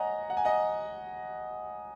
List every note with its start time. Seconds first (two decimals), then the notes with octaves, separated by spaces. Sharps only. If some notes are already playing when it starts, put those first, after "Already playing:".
Already playing: C#5 D#5 F#5 G#5 A#5
0.30 F#5
0.37 G#5
0.45 D#5 F#5